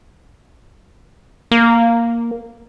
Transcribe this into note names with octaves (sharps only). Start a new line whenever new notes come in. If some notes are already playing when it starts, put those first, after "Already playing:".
A#3